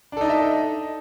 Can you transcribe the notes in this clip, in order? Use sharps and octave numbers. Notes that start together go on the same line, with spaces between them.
D4 D#4 A4 D#5 E5